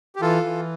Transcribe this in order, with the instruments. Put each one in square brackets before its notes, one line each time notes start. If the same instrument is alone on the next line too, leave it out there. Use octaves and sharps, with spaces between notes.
[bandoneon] G4
E3 F4 A4
E3